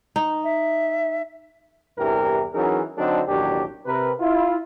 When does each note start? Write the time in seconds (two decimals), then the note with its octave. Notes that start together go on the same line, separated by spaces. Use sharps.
0.16 D#4
0.44 E5
1.98 E2 G2 C3 E3 G4 A#4
2.53 E3 F#3 C#4 D#4 G#4 A#4
2.97 D3 F#3 C4 D4 D#4 A4
3.28 A1 D#2 B2 F#3 D4 G4
3.86 C3 A#4 B4
4.19 E4 F4